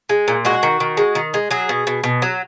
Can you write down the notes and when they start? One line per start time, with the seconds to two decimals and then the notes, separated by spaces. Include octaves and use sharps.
0.09 G#3
0.28 A#2
0.45 G#3 F#4
0.63 D#3
0.80 D#3
0.97 G#3
1.15 D#3
1.34 G#3
1.51 F#3 G#4
1.69 B2
1.87 B2
2.04 B2
2.22 F#3